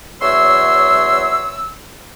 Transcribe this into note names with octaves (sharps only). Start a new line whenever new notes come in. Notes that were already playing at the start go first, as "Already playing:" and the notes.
E2 F#3 C#5 E5 C6 E6